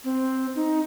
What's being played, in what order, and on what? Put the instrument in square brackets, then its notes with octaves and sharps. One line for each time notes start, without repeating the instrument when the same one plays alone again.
[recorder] C4
D#4